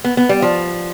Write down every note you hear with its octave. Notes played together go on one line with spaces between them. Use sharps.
B3
B3
G3
F3